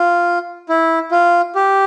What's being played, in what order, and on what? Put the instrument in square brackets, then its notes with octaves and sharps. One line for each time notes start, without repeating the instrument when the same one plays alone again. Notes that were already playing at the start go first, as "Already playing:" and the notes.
Already playing: [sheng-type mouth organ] F4
E4
F4
G4